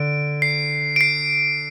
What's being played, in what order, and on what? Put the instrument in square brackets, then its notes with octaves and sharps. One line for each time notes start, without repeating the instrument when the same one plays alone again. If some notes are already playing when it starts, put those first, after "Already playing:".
Already playing: [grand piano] D3 [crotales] D7
[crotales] C7
D7
C7